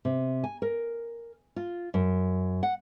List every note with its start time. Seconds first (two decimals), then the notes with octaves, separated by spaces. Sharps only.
0.05 C3
0.44 G#5
0.62 A#4
1.56 F4
1.94 F#2
2.63 F#5